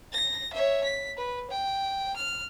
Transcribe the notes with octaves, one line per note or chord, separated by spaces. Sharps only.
A#6
C#5 E5
B6
B4
G5
F6